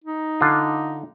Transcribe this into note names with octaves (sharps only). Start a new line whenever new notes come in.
D#4
D3 F4